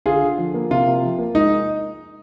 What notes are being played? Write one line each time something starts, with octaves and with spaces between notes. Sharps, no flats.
D3 F4 G#4
D3
F3
A#3
C3 F4
C3
F3
A#3
G#3 D#4